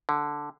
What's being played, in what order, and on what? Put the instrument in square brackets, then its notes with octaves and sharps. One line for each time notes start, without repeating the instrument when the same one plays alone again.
[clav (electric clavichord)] D3